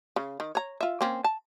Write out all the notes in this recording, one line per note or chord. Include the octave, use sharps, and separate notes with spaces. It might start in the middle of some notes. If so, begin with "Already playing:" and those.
C#3
D#3
C#5 A#5
F4 E5
A#3 C4 C#4
A5